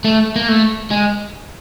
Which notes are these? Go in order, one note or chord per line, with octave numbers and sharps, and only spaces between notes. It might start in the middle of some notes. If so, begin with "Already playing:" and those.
A3
A#3
A3
G#3